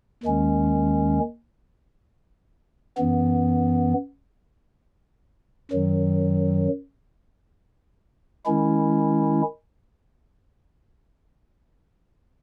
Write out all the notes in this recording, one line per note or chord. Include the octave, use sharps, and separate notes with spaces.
D#2 D#3 G#3 C#4
F#2 E3 B3
F#2 D#3 F#3
D#3 G#3 C#4 E4